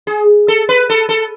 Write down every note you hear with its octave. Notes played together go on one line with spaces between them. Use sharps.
G#4
A4
B4
A4
A4